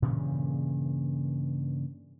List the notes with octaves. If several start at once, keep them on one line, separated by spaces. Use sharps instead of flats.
G2 A#2 C#3 E3